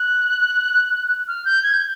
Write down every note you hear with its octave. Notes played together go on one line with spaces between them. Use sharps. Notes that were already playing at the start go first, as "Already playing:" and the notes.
Already playing: F#6
F6
G6
G#6
G6